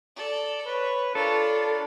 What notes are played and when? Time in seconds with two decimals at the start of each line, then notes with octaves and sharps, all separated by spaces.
0.16 A4 D5
0.66 B4 C#5
1.15 D4 F4 A4 A#4 C#5 B5